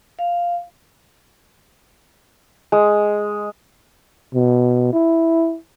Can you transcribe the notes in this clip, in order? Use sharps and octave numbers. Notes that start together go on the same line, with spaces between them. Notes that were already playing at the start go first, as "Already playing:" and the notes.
F5
G#3
B2
E4